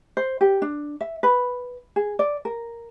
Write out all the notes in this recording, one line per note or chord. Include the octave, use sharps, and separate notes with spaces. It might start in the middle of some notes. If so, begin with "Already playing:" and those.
C5
G4
D4
E5
B4
G#4
D5
A#4